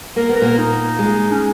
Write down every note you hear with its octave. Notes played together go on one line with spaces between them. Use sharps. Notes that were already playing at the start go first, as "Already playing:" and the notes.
A#3 A#4
B3
A#4
A#2 A#3
D#4
G#3
C#4